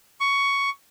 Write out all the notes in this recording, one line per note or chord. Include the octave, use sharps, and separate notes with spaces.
C#6